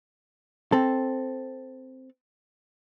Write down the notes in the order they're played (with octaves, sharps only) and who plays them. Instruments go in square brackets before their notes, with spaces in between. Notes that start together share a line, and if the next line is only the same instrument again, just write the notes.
[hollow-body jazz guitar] C4 A4